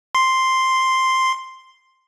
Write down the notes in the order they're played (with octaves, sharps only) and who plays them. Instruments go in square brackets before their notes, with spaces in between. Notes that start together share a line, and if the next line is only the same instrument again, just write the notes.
[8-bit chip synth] C6 C7